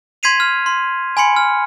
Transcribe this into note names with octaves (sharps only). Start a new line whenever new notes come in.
C6 G#6 B6 C7 D#7 F7
F6
C6
G#5 B5 C6 C#7
F6